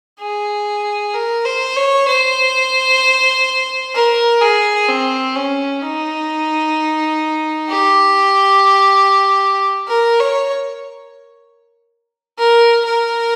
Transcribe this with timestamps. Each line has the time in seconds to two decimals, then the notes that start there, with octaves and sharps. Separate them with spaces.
0.20 G#4
1.14 A#4
1.45 C5
1.76 C#5
2.08 C5
3.95 A#4
4.41 G#4
4.89 C4
5.35 C#4
5.82 D#4
7.70 G4
9.88 A#4
10.20 C#5
12.38 A#4
12.85 A#4